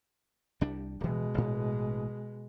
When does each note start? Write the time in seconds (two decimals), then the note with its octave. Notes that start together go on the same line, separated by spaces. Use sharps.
0.61 C2 G3 D4
1.01 D1 B2 E3 G#3
1.34 A1 A2